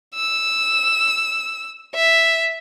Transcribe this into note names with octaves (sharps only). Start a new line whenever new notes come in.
E6
E5